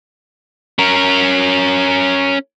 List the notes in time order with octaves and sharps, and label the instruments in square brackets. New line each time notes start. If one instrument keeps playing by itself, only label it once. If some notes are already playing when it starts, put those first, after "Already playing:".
[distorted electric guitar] C#4 A#4